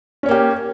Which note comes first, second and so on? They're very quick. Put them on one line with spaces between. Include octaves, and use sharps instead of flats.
C#4 C#5 A#3 G4